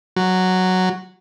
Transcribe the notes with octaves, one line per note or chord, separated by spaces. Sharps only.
F#3